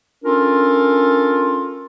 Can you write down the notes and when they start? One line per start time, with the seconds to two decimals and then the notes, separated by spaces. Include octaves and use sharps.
0.25 C#4 D4 F4 A4 A#4